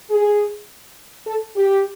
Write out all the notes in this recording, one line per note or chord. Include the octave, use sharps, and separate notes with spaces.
G#4
A4
G4